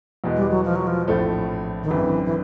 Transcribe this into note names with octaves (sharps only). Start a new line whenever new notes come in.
E2 B2 G#3
G3
F#3
F3
F#3
F3
A#1 A2 F3 A3 C4
D#3
G#1 F#2 D3 E3
E3